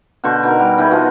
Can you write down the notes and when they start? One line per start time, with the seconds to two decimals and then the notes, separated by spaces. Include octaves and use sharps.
0.24 B2 D3 C5 C#6
0.43 B2 D#4 A#4
0.59 G3
0.78 E3 B3 D#4 G#4
0.90 F3 B3 F#4